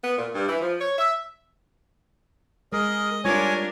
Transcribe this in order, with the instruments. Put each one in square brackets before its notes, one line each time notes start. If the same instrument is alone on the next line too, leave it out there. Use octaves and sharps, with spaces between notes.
[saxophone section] B3
A#2
G2
E3
F3
C#5
E5
[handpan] G#3 [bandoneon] G#4 A#4 [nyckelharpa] D#5
[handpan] G3 F4 [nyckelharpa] D4 A#4 [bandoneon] C#5 G#5